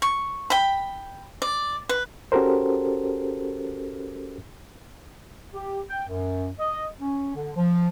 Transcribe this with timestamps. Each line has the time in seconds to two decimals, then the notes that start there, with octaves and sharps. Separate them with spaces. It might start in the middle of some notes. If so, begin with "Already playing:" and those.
0.02 C#6
0.50 G5 B5
1.42 D5
1.89 B4
2.32 C#4 F#4 G4 A4 A#4 C5
5.54 G4
5.89 G5
6.08 F#2
6.59 D#5
7.00 C#4
7.35 D3
7.56 F3